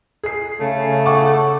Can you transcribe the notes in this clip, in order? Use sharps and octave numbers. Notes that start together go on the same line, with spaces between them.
G#4 C7
C#3 A3
F#5 C#6 D6